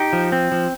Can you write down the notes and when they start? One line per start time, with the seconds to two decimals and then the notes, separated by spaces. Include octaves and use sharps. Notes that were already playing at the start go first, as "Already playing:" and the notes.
Already playing: D#4 G4
0.13 F3
0.32 C4
0.52 F3